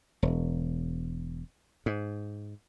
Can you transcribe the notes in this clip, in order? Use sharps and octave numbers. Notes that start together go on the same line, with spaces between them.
E1
G#2